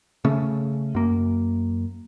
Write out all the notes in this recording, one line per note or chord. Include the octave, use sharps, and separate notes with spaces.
C#3 A3 C#4
F#2 A#3